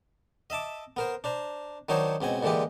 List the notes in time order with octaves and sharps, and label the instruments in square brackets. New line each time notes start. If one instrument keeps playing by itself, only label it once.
[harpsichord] D#5 E5 A5 D6
B3 A#4 C5
D4 C5 A#5
D#3 F#3 D4 D#4 C5 C#5
C#2 B2 C4 G#5
A#2 D3 E3 G#3 G4